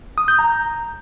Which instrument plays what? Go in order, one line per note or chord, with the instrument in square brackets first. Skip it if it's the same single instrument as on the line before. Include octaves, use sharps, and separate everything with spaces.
[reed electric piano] D#6
G6
A#5